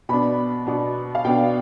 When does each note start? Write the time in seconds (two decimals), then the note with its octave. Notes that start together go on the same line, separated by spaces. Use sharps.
0.09 B2 B3 D4 B5
0.66 B2 B3 D4
1.15 F5
1.25 B2 B3 D4 G5